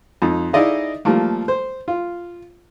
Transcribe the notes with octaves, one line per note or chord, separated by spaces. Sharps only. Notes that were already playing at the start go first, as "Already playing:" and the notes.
F2 D#4
D#4 E4 G#4 D5 D#5 F5
F3 G3 A3 A#3
C5
F4